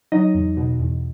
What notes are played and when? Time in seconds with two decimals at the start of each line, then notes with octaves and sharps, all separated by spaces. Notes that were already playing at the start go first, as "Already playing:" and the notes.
0.12 F#3 D#4 D#5
0.35 E2
0.57 B2
0.80 E2